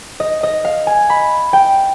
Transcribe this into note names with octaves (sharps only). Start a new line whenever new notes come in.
D#5
D#5
F5
G#5
B5
G5